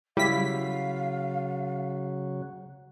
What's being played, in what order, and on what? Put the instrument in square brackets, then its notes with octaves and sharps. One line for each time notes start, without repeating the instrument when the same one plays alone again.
[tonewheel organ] C#3 F#3 [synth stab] G3 B6 [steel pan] E4 [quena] F5